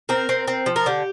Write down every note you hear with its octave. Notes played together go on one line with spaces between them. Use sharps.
C4 A#4
C4
C4
F3
A#4
D3 G4